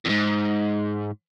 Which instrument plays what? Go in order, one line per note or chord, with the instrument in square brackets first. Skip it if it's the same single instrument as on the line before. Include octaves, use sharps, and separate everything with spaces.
[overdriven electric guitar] E2 G#2